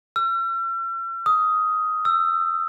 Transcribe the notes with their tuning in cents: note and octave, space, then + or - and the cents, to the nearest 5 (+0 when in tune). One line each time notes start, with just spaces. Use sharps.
E6 +45
D#6 +10
E6 +25